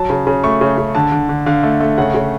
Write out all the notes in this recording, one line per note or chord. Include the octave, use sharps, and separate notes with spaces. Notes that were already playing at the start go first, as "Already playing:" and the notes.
Already playing: F#3 A5
C#3
C#3
A3 C#6
C#3
C#3
D3 A5
D3
D3
D3 F5
A3
A3
C#3 F#5
C#3